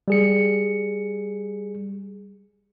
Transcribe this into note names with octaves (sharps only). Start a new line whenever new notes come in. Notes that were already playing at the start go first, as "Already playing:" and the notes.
G3 G#4 C#7